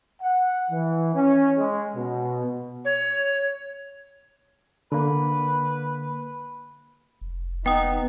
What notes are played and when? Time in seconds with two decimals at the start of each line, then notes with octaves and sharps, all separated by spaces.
0.21 F#5
0.70 E3
1.14 C#4
1.57 G#3
1.95 B2
2.85 C#5
4.92 D3 A#3 B4
7.21 F1
7.66 B3 D#4 G5 D#6